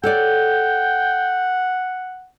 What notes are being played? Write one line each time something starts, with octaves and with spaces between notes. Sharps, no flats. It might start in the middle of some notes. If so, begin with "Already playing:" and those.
A4 C#5 D5 F#5 G5